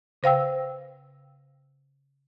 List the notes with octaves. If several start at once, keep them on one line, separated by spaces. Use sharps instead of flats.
C#3 C5 F5 G5 E6